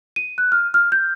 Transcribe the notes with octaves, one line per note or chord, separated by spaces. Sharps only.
D#7
F#6
F6
F6
G6